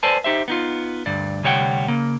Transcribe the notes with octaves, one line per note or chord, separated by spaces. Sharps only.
A4 B4 C5 D5 G#5 A5
D#4 G4 C5 E5
B3 D#4 F4
D2 G2 D5
D2 C3 G3 C#5 F#5 G5
C#3 A#3